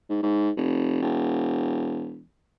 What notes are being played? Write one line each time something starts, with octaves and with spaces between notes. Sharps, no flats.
G#2
G#2
F1
E1